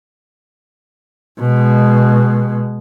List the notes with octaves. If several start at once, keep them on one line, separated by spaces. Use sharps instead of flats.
B2 G#3